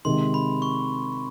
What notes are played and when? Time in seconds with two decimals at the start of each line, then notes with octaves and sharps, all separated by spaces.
0.05 C3 D#3 G#3 C6
0.34 B5
0.62 C#6